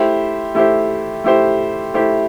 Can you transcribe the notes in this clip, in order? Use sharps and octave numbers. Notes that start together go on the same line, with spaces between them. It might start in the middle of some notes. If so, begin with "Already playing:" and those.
Already playing: A3 E4 G4 C5
A3 E4 G4 C5
A3 E4 G4 C5
A3 E4 G4 C5